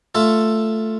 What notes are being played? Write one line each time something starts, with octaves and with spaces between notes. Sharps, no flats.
A3 F4 A4